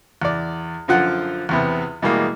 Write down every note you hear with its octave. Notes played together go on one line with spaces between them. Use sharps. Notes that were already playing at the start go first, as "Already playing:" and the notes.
E2 D5
F#2 D3 F3 F4 F#5
E2 C3 B3
B2 E3 G3 G#3 A#3